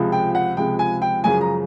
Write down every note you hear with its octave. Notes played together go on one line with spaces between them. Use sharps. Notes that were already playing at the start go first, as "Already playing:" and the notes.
Already playing: C#2 C3 F3 G#3
G5
F#5
C#2 C3 F3 G#3 G5
G#5
G5
F#2 C#3 F3 G#3 G#5
A#5